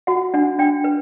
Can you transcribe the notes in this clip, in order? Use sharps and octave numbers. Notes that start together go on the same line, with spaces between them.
F#4 F#5
D4 F#5
D4 G5
B4